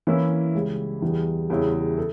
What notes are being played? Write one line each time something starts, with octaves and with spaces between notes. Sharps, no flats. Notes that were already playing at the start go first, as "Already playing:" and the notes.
E3 A#3 C#4 E4
C#2 C#3 G3
E2 E3 G3
E2 C#3 G3 C#4 E4
A4